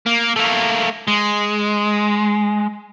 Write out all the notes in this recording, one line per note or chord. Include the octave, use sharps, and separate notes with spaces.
A#3
A3 A#3
G#3